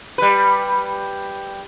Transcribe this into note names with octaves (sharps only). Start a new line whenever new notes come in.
G3 B4